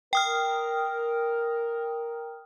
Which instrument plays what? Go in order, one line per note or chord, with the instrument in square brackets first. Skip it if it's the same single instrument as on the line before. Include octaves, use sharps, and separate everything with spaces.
[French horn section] A#4 [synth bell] G5 D#6 F6